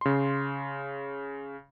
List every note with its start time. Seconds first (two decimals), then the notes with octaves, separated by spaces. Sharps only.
0.01 C#3 C6